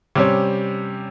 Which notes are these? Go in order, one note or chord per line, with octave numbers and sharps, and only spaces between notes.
C3 G3 C#4